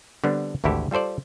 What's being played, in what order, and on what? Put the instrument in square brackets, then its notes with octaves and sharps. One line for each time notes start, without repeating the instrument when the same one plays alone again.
[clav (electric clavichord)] D3 G3 B3 C4 D4
G#1 D2 E3 E4 G4 A4
G3 F4 A4 C5 D5